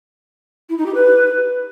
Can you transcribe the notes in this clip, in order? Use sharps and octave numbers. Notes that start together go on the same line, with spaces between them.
E4
D#4
G4
B4